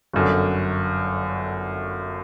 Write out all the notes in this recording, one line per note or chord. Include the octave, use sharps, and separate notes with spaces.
G1 F#2 D3